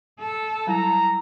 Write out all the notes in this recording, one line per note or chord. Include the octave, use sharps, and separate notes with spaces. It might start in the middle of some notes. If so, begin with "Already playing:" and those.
A4
F#3 G3 E4 A#5